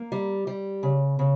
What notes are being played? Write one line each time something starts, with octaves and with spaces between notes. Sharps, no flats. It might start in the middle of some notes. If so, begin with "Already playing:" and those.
Already playing: A#3
G3
G3
C#3
C#3